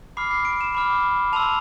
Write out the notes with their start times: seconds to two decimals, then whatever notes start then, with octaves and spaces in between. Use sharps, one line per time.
0.17 B5 D6 F6 C7
0.31 C7
0.45 D7
0.61 E7
0.75 B5 D6 F6
1.33 A5 C6 E6 F7